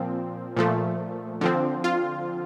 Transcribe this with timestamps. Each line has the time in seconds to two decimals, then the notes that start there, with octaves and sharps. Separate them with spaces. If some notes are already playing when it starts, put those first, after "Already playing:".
Already playing: A#2 F3 C4
0.56 A#2 F3 A3
1.41 D3 F3 C4
1.84 F4